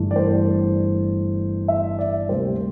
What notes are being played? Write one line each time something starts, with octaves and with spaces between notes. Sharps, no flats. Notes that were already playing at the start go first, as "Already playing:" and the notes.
Already playing: G1 G2 E3 A3
D5
C5
E5
D5
D2 C3 G3 A#3 C5